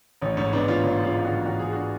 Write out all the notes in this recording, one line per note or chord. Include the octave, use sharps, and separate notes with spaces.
A1 C#4
G#2 C#4
G#2 B3 D4
A1 C#4 F4
A1 C#4
G#2 C#4 F4
G#2
D4 F#4
A1
A1 F#4
G#2 G#4
D4 F#4